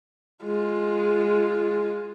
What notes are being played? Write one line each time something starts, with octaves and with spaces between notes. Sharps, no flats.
G#3 F4